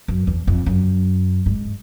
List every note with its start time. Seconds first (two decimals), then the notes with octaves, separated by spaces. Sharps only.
0.08 F#2
0.27 E2
0.47 F2
0.66 F#2
1.46 G#2